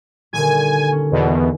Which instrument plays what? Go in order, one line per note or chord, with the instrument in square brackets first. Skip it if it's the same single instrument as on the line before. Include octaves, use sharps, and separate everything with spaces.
[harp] D#1 D3 [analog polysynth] G#5
[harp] C#4
[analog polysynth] E2 B2